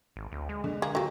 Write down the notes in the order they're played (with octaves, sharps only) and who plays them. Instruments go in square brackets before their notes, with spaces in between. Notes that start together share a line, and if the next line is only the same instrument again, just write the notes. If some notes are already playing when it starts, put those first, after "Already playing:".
[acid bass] G#1
D2
G#3
[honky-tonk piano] D3
[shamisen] A#3 G#4
[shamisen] F#3 A#3 [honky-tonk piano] F4 G4 A4